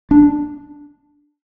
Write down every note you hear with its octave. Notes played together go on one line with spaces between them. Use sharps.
D4